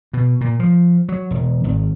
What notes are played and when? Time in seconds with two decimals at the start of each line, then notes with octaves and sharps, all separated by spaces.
0.13 B2
0.41 A#2
0.60 F3
1.09 F#3
1.31 E1
1.64 G#1